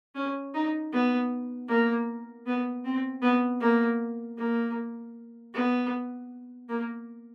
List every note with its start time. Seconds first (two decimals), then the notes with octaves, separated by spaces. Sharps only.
0.15 C#4
0.54 D#4
0.93 B3
1.68 A#3
2.46 B3
2.85 C4
3.22 B3
3.60 A#3
4.38 A#3
5.54 B3
6.69 A#3